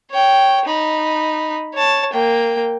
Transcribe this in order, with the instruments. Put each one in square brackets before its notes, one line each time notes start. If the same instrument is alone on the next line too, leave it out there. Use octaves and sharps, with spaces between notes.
[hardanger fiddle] C#5 G5
D#4 B5
C#5 A5
A#3 G5